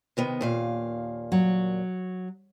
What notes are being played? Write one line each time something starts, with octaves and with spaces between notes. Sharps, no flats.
C3 D#3 B3
D#2 A#2 F5
F#3